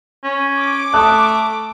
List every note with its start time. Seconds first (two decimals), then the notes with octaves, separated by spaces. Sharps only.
0.24 C#4
0.59 D6
0.94 A3 A5 D#6 F#6